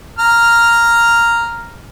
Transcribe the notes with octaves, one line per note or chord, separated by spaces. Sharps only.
A#5 F6